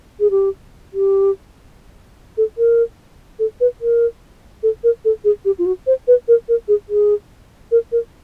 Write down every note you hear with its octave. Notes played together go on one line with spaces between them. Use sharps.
G#4
G4
G4
A4
A#4
A4
B4
A#4
A4
A#4
A4
G#4
G4
F4
F#4
C5
B4
A#4
A#4
G#4
G#4
A#4
A#4